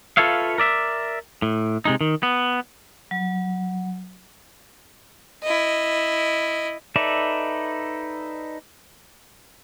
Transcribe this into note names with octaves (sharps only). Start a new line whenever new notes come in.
F4 A4 B4 C#5 E5 F5
A#4 D5 E5
A2
C3 G#3 D#4
D#3
B3
F#3
E4 D#5
D#4 A4 B4 D5 E5